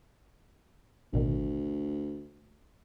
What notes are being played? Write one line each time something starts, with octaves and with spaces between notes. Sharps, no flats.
A1 D2 B2 D#3